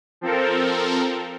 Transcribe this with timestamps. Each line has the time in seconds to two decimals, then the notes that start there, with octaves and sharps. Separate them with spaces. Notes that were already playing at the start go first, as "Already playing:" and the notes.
0.21 F3 C4 A4 A#4